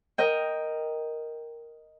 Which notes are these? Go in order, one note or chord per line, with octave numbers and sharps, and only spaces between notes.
A#4 D#5 G5